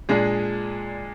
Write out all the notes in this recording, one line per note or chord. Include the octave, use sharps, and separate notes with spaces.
A#2 G#3 D4 G#4